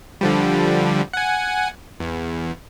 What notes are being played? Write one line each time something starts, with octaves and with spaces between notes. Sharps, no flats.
D3 F3 G3
F#5 G#5
E2